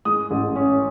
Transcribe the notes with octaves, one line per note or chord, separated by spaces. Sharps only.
G#3 D#6
A1
C#4